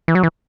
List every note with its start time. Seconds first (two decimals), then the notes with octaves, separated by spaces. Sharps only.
0.08 E3
0.15 F#3
0.23 E3